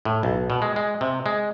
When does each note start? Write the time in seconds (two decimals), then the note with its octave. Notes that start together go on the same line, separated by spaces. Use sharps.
0.05 A2
0.23 B1
0.50 B2
0.62 G#3
0.76 G#3
1.01 C3
1.26 G#3